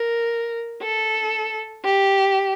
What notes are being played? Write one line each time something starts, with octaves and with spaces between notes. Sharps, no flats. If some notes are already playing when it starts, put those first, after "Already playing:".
Already playing: A#4
A4
G4